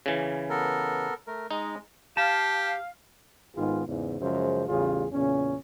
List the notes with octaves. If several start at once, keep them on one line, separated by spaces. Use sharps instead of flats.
C#3 E3
B3 A4 A#4
A3 A#4
G#3 D#4
G4 F5 A5
G#1 G#2 D#3 B3 F4 G#4
E2 G#2 C#3
F#2 C#3 F3 G#3 C5
A1 E2 C#3 G3 F4 G#4
E2 A#2 C#3 C#4